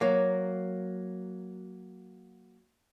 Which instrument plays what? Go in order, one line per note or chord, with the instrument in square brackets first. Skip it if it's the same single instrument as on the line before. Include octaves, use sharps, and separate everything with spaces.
[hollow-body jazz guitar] F#3 A#3